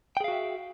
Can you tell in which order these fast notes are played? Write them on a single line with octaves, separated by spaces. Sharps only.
G5 G#4 F5 F#4 E5